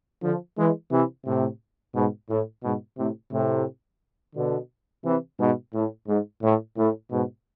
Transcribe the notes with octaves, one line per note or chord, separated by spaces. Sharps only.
D3 F3
E3 G#3
C3 E3
A2 C3
G#2 B2
A2
G#2 B2
A2 C3
A2 C3
B2 D3
C3 E3
G#2 B2
A2
G#2
A2
A2
G#2 B2